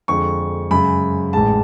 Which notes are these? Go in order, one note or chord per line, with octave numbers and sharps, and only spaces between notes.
F2 D3 G#3 C#6
F#2 C#3 G#3 B5
A1 G#2 G#3 A5